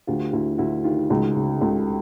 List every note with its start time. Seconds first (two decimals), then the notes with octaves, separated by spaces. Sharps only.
0.07 D2 F4 G4
0.33 D2 E4 F#4
0.58 D2 E4 F#4
0.84 D#3 F4 G4
1.10 C#2 F#4 G#4
1.36 C#3
1.61 C#2 G4 A4